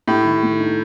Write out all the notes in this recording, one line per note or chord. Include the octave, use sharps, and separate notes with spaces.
A2 G4
D#3
A3
D#4